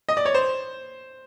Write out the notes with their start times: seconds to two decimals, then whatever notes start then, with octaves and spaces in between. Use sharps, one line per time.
0.09 D#5
0.17 D5
0.25 C#5
0.34 C5